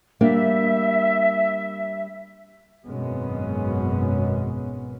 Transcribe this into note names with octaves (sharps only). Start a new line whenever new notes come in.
G3 A#3 D4 E5
G#1 F#2 B2 G#3 B3 C#4